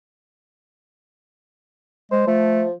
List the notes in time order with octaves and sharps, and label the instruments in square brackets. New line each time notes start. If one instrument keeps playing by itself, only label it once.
[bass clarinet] G#3 [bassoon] C5
[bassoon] F3 [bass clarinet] A3